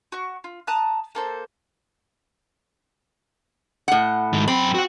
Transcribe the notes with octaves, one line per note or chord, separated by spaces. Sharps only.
F#4 C#6
F4
A5 A#5 D#6 F#6
A#3 A4 C5
A2 F#5
G#2 D#3
F#2 C4 B5
F#4 F#5